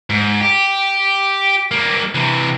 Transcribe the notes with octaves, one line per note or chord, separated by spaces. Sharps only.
G#2
G4
G3 A#3
C3 E3